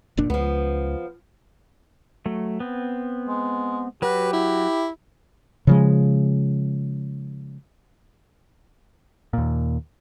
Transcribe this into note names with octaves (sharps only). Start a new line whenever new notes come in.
F1 A#2 D4
C#2 F3 B3
F#3 A3
B3 C4
G#3
F#3 F#4 G4 B4
E4
C#3 F3 G#3
D#2 A#2